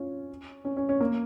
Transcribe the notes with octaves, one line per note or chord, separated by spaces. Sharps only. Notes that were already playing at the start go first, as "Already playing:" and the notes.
Already playing: C#4 F4
C#4
C#4
C#4
A#3